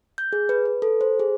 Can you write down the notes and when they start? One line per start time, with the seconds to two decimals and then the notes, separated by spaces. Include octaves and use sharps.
0.18 G6
0.33 G#4
0.49 B4
0.65 B4
0.82 A4
1.01 C5
1.20 G#4